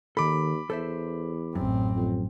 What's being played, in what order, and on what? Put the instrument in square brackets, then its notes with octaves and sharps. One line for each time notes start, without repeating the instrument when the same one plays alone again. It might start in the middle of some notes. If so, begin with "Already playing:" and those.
[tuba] D#2 [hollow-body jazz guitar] D#3 A4 [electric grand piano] B5 D6
[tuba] E2 [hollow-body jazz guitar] A4 C5 E5
[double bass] A1 C4 [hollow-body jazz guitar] F#2
[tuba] F2